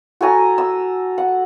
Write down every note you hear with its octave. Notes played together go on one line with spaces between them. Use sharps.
F#4 A4 G#5 A#5
E6
F#5